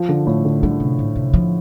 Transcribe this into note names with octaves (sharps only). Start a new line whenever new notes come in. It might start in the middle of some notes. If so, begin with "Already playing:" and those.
Already playing: F3
D3
A2 F3
D3
D3 G3
C3
A2
C3
F3